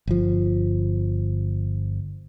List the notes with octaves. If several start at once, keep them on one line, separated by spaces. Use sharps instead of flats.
G1 F3